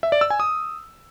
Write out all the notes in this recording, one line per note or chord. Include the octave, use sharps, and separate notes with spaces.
E5
D5
E6
G#5
D#6